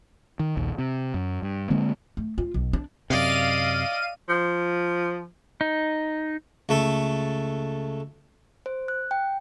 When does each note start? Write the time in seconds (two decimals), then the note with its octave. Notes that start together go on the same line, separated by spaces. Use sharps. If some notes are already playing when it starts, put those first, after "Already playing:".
0.40 D#3
0.57 A#1 D#2
0.79 C3
1.14 F#2
1.42 G2
1.70 D3 G#3 A#3 C4
2.17 A3
2.38 F4
2.54 B1
2.73 D4
3.10 F#2 C3 D5 D#5 F5 D#7
4.29 F3
5.61 D#4
6.69 C#2 A3 A4
8.66 C5
8.88 F#6
9.11 G5